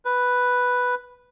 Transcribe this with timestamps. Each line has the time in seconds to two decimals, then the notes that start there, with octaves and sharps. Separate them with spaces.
0.05 B4